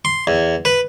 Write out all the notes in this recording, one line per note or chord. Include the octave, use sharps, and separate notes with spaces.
C6
E2
B4